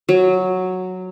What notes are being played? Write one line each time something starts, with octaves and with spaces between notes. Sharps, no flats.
F#3